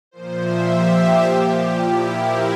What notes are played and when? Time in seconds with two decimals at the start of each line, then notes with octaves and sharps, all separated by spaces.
0.11 A#2 F3 C5
0.40 E5
0.69 G4
1.26 A#2 F3
1.83 E4
2.12 A#4